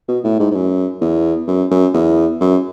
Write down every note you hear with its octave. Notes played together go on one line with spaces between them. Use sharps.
B2
A2
G#2
G#2
F#2
E2
F#2
F#2
E2
F#2